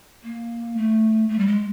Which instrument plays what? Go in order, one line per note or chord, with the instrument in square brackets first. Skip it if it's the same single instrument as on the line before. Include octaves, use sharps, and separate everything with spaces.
[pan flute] A#3
A3
A3
G3
G#3